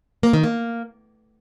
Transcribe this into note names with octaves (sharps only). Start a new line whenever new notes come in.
A#3
D#3
A#3